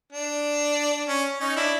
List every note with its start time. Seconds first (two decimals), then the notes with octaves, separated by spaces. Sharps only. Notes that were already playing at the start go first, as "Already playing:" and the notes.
0.13 D4
1.08 C#4
1.40 C#4 D#4
1.57 D4 E4